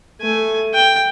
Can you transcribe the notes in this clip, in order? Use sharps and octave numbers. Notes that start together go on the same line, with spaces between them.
A3 G#5
G5